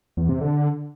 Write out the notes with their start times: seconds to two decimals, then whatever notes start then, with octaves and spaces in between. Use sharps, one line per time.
0.17 E2
0.29 C3
0.41 D3